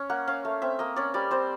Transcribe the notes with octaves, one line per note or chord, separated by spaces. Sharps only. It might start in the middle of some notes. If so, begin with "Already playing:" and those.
Already playing: C#4
A#3 F#5
C#4 F5
A3
C4 E5
A#3 D#5
C#4 D5
G3 D5
C4 C5